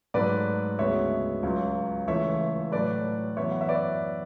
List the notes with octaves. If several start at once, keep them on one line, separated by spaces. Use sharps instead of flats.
G#2 F#3 A3 B4 D5
D2 C#3 G#3 B3 C#5 E5
C#2 C#3 F#3
C#2 C#3 E3 A3 C#5 E5
A2 F#3 A3 B4 D5
F#2 E3 B3 C#5 E5
F#5
E5
B4 D5